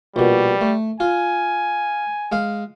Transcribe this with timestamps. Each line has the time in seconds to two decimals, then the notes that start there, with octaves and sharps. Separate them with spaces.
0.16 A#1 B2 G3
0.61 A3
1.00 F4 G#5
2.32 G#3 F5